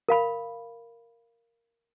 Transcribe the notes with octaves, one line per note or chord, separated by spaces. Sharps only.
A#4 F5 B5